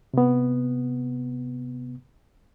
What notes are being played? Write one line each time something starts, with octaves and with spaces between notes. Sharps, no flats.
C3 B3